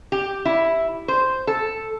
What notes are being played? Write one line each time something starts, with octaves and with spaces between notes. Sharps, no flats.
G4
E4
C5
A4